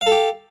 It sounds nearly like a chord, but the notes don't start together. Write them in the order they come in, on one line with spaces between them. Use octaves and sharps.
F5 A4 G4